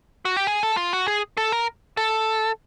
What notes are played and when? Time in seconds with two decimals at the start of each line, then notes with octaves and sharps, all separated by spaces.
0.25 F#4
0.37 G4
0.47 G#4
0.63 A4
0.77 F4
0.93 F#4
1.08 G#4
1.37 A4
1.52 A#4
1.97 A4